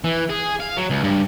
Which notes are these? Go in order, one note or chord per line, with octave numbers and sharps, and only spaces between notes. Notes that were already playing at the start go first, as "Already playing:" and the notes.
E3
G#4
F5
F#3
C#2
G2